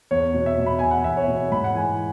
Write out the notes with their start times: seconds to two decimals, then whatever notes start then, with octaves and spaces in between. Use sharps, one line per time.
0.11 E2 C#5
0.34 B2
0.46 E5
0.58 B2
0.66 B5
0.79 E2 G#5
0.91 F#5
1.04 E2 E5
1.17 C#5
1.28 B2
1.52 G#2 B5
1.64 F#5
1.75 E3 G#5